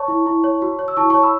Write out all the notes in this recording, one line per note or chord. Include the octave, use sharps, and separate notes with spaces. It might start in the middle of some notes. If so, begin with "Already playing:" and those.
Already playing: C#5 A5 C#6
E4
E4
C#5
F#4
C#5
E6
E4 A5 C#6
C#5 A5 C#6
B5 E6